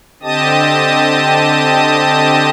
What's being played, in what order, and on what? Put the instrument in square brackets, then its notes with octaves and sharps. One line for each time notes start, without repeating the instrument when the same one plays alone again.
[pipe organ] D3 C4 G4 D#5 A5 D#6